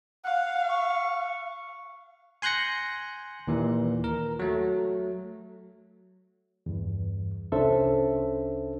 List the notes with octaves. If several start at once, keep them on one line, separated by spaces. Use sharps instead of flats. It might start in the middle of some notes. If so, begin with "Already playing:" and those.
F5 F#5
C#6
G#5 C6 F#6 G6 A#6 C#7
D#2 A#2 E3
A#4
F#3 A3
E2 G2
C2 C#4 D4 A4 C5 E5